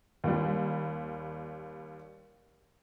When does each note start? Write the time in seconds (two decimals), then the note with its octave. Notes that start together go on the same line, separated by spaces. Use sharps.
0.24 D#2 G3